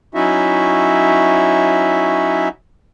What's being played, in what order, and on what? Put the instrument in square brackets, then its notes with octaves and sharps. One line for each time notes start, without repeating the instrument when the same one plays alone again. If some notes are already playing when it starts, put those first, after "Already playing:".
[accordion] F#3 C#4 D#4 E4 F#4 E5